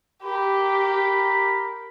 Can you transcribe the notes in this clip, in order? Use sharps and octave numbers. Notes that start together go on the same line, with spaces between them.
G4 A#4 B5